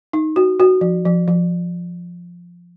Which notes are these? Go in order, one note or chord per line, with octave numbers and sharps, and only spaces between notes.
D#4
F#4
F#4
F3
F3
F3